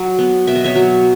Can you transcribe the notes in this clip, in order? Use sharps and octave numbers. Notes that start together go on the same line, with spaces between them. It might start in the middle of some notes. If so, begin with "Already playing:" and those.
Already playing: F#3
B3
B2 E5
D#5
C#5 E5
F#3